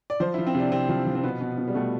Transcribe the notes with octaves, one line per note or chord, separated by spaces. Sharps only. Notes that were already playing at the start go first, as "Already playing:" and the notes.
D5
F3 C5
E4
F3
C4
C3
D4
C3 C4
F3
F3
C4
B2 B3
B2
B2
G3
B2 A3